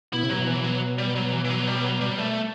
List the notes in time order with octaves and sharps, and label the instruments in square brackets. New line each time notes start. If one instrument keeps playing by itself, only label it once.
[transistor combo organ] B2 [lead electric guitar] E4
[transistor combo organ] C3
[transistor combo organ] B2 [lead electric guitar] F#3
[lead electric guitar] E3
F#3
G3
F#3
E3
E3
F#3
G3
F#3
G3
A3